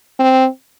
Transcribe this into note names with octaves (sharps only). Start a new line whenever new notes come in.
C4